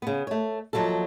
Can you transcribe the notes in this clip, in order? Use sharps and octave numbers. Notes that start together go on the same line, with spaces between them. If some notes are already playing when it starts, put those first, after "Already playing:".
C#3 B3
A3 C#5
D#2 F3 F#3 E4 A4